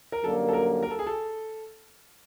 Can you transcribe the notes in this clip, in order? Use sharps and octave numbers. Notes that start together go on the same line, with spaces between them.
A#4
F#2 D3 G3 A#3 A4
A4
A#4
A#4
A4
G#4
A4